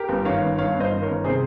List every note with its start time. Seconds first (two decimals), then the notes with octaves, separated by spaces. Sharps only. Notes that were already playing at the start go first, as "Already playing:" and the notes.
Already playing: G4 A#4
0.09 G1
0.25 D#3 C#5 F5
0.42 G1
0.58 G2 C#5 F5
0.75 G1
0.80 C5 D#5
0.92 D#3
1.02 G1 A#4 C#5
1.24 C3 G#4 C5